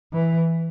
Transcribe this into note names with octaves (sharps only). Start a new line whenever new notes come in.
E3